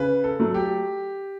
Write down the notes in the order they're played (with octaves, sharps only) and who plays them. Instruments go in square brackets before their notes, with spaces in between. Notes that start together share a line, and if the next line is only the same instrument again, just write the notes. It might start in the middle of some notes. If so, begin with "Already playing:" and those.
Already playing: [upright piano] C#3 [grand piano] B4
[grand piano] A4
[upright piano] F#3 A3
[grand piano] G4